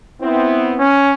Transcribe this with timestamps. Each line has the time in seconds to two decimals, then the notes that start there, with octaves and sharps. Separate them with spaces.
0.21 B3 C4 E4
0.80 C#4